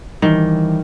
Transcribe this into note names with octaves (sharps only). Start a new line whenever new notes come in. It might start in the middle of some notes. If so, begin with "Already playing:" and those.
D#3 E3 G3